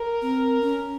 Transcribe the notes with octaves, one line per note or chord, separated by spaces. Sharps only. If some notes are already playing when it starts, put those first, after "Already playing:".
Already playing: A#4
C4
C#4